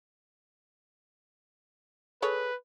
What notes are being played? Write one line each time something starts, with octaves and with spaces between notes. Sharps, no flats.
G#4 A4 B4 C#5